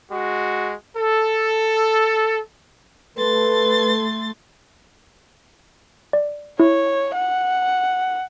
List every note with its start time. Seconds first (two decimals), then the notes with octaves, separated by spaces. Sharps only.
0.12 G#3 F#4
0.98 A4
3.18 A3 A4 B4 C6 A6
6.13 D5
6.60 E4 C#5
7.15 F#5